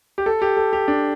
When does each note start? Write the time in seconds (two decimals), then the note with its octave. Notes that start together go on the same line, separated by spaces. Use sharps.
0.18 G4
0.26 A4
0.42 G4
0.57 A4
0.73 G4
0.88 D4